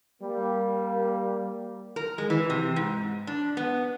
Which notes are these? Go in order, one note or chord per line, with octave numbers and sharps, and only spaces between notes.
G3 A#3
A#4
G#3
E3
C3
G#2
D4
B3